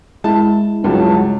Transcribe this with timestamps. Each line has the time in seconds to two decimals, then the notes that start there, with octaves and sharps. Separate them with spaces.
0.24 G#3 E4 A5
0.84 C#2 G2 F#3 A5